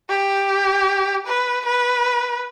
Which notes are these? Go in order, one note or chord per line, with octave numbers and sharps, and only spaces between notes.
G4
B4
B4